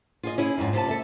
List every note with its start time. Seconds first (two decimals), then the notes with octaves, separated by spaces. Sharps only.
0.23 F4 G#4 D#5
0.38 C#4 E4 G#4
0.58 F2 G#2
0.73 C3 F4 A5
0.88 A4 E5